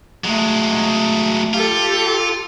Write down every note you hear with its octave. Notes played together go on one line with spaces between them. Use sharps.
F#3 G#3 A3
F4 G4 A4